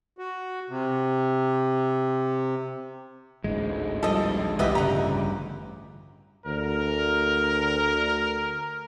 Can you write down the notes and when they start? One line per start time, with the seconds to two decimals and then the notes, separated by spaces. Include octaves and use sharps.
0.18 F#4
0.69 C3
3.44 A1 D2 G#2 G#3
4.03 F3 G3 A4 D#5
4.59 C2 E3 B3 F4 G4 B4 D#5 E5
4.75 A1 D2 G2 C#3 G3 F#5 A#5
6.46 D2 A#4